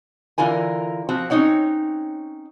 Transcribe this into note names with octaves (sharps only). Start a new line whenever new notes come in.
D3 E3 F4 A#4 G#5
F3 C4 F#4
C4 C#4 D#4 C#5 F#5